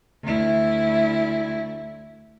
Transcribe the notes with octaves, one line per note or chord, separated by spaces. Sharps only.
D2 E4